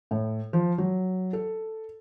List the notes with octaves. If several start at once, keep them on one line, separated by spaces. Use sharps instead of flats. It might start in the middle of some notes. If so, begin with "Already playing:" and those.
A2
F3
F#3
A4